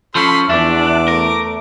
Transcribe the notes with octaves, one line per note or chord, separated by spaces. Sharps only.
F3 C#4 A4 B5 C6
E2 D4 E5 D6
A3 A#4